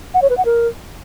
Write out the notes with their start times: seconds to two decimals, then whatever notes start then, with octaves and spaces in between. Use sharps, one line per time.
0.14 F#5
0.22 C#5
0.30 B4
0.38 F#5
0.45 A#4